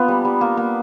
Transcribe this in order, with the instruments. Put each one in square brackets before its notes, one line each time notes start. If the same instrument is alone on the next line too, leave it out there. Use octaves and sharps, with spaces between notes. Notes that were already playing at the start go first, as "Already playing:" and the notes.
Already playing: [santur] A#3 B3 D4 F4 B4
G3
G3
A#3
A#3